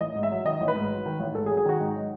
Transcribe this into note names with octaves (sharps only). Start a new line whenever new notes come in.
A1 D#5
G#2
E5
F#3
D#3 D#5
A1
B4
G#2
F#3
D#3
A1
G#2 A4
G#4
F#3
G#4
D#3 F#4
G#2 D#4
F#3